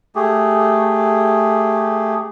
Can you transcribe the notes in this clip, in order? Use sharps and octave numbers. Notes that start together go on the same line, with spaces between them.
A3 G4 G#4